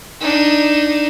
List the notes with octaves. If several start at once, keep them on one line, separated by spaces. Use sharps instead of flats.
D4 D#4